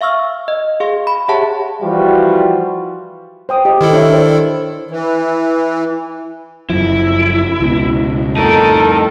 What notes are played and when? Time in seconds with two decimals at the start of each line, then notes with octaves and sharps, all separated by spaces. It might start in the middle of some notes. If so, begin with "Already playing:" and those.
0.01 E5 F5 C#6 E6 F6
0.48 D#5
0.80 G#4 F5 C6
1.07 B5
1.28 G4 G#4 C#5 E5 F#5 A5
1.82 E3 F3 G3 F4 F#4
3.49 C5 G5 D#6
3.65 G4 D#5
3.81 D#3 E4 A4
3.93 D4 C#5 E5
4.13 C5 D5
4.91 E3
6.70 F#1 F#2 F3 E4
7.60 C#2 B2
8.37 F2 A2 D#4 A4 A#4